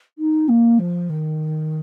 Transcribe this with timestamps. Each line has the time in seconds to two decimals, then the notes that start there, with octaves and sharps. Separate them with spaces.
0.18 D#4
0.49 A#3
0.79 F3
1.10 D#3